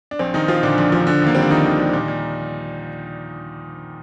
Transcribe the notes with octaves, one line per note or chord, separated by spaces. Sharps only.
D4
A#1 C4
A#1 D#3 D#4
A#1 F3 F4
A#2 D3 D4
A#1
F3
D3
D#2 A#3
G3 C4
D4
D#2 D#3 D#4
D#2
G3
A#2
A#2